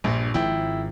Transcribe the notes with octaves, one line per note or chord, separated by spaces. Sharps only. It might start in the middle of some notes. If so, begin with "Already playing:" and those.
A#1 G2 A#2
G#1 G#2 F3 E4 G5